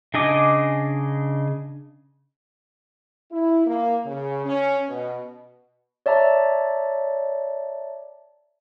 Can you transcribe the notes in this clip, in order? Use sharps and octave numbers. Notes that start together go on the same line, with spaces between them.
C#3 D4 D#5 G#5 D6
E4
A#3
C#3
C#4
B2
C#5 D5 E5 A5 A#5